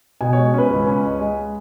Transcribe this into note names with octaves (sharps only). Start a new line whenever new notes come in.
B2 G#5
C#5
G#3
C#4 B4
C#2
C#4
G#3
G#3